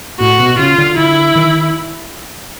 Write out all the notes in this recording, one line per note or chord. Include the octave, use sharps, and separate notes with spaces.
A2 F#4
B2
C#3 F4
D3
D3 E4
D#3